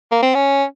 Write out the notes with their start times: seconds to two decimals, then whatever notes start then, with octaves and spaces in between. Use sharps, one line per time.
0.11 A#3
0.22 C4
0.35 C#4